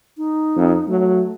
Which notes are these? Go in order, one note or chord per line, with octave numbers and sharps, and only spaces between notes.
D#4
F2
F#3 A3